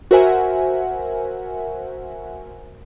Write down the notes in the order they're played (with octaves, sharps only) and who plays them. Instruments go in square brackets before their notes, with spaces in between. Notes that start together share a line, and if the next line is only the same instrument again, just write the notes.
[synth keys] F#4 A#4 C5 E5 F#5 G#5